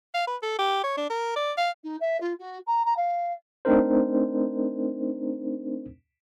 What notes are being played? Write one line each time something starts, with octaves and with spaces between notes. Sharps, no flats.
F5
B4
A4
G4
C#5
D4
A#4
D5
F5
D#4
E5
F4
F#4
A#5
A#5
F5
A3 C4 D4 D#4 A#4 C5